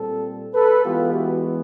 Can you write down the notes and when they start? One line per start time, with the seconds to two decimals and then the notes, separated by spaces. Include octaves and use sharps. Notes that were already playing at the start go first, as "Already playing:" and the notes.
Already playing: A#2 G3 C4 A4
0.54 A4 B4
0.83 E3 G#3 B3 F4 G4
1.13 E4 F#4